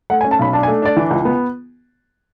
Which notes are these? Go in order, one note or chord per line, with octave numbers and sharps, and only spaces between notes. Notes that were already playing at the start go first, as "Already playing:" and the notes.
A3 F#5
G#5
C#4
A5
B1 B5
D4 A5
G#5
A3
D4 D5
E3
C#2
B3